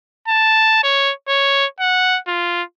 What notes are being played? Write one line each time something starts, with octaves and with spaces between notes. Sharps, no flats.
A5
C#5
C#5
F#5
F4